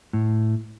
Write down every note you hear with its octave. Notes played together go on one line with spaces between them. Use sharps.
A2